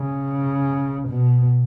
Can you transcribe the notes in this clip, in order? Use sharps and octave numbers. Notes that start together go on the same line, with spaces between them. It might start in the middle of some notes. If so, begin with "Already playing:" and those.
Already playing: C#3
B2